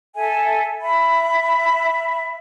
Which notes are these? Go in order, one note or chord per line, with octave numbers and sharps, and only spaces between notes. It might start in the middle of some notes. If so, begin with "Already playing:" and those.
A4 E5 G#5
E5 B5